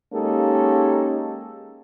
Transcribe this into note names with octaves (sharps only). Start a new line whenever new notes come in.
G#3 A#3 C#4 D#4 G4 A4